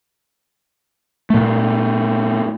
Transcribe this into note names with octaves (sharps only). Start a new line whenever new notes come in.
A#2 A3